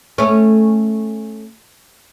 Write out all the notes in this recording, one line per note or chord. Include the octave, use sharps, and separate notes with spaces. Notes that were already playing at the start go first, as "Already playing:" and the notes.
A3 C#4